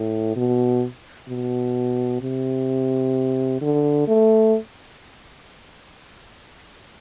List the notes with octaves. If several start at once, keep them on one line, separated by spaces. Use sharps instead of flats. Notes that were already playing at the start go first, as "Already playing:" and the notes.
Already playing: A2
B2
B2
C3
D3
A3